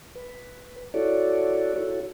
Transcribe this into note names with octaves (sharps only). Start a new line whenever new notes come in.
B4
E4 F#4 A4 C#5 D5
E4 F#4 A4 C#5